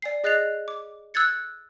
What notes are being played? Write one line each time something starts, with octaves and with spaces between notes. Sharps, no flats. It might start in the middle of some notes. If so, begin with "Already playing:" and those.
D5 G#5 C7
G#4 D#5 F#6 A6 C7 F7
D6
E6 F#6 G#6 A6 C#7